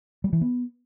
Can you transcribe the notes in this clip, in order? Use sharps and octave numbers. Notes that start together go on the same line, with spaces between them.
G3
E3
B3